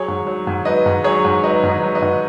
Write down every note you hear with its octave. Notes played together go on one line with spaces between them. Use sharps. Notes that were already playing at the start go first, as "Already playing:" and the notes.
Already playing: F#3 G#4 C#5
G#2
F#3
G#2
F#3 B4 D#5
G#2
F#3 G#4 C#5
G#2
F#3 B4 D#5
G#2
B4 D#5
F#3
B4 D#5
G#2